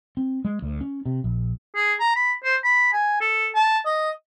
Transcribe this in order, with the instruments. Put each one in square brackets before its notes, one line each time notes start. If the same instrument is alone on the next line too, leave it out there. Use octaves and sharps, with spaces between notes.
[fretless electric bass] C4
G#3
D2
C#4
C3
A#1
[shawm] G#4
A#5
B5
C5
B5
G#5
A4
A5
D#5